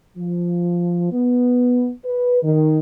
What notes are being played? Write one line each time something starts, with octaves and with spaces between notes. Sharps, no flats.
F3
B3
B4
D#3